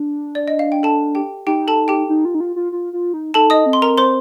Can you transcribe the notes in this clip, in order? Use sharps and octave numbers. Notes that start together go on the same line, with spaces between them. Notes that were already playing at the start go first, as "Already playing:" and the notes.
Already playing: D4
D5
D#5
F5
G5
A4 A5
G4 G5
D#4 G4 G5
A4 A5
G4 G5
D#4
F4
D#4
F4
F4
F4
F4
D#4
D#4 A4 A5
D#5 D#6
C4
C6
A#4 A#5
C5 C6